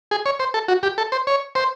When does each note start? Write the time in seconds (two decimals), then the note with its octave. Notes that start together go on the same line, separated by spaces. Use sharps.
0.11 G#4
0.26 C#5
0.40 C5
0.54 A4
0.68 F#4
0.83 G4
0.98 A4
1.12 C5
1.27 C#5
1.55 C5